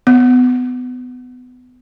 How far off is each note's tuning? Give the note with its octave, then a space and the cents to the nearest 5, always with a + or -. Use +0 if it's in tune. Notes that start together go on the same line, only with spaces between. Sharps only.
B3 +25